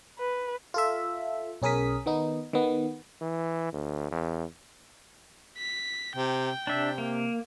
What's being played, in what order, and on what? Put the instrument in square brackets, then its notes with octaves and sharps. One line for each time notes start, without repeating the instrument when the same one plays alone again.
[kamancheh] B4
[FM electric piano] F4 A4 E5
B1 C#4 G#4 A#4 D#6 B6
D#3 B3 D#4
D#3 B3
[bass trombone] E3
D2
E2
[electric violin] B6
[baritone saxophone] C3 [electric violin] G5
[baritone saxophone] C3 [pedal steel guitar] D4 E5
[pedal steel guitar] A#3